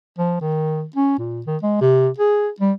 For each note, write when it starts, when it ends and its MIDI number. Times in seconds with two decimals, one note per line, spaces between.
0.18 0.37 53
0.41 0.85 51
0.96 1.16 61
1.19 1.41 46
1.46 1.57 51
1.63 1.77 56
1.81 2.09 48
2.18 2.49 68
2.60 2.72 55